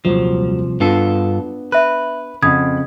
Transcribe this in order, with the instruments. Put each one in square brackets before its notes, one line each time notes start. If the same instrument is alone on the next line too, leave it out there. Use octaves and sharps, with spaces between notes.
[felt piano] D#1 F#3 C5 [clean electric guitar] C2 F3
[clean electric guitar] G2 F4 A4 [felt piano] B3 D4
[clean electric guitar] B4 [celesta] E5 F#6
[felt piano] F2 F#5 B5 [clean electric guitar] C#3 [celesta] D#6 G#6